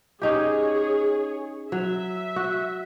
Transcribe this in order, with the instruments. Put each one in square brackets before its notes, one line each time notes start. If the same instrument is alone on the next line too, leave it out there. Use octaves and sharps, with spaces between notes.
[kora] C#4 D#4 G4 [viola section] G#4 C#5
[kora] F#3 [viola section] E5
[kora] F#4